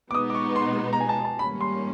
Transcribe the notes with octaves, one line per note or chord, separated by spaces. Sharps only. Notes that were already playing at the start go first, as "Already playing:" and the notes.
D6
B2 G#3 B3 D#4 D#6
D6
C#6
C6
A#5
G#5
A5
A5
G#2 D#3 G3 A#3 C#4 B5
C6